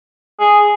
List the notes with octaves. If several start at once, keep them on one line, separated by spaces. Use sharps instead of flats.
G#4